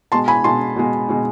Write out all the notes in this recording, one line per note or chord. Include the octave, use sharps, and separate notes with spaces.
B2 G#3 A5 C6
G#5 B5
B2 G#3 A5 C6
B2 G#3
B2 G#3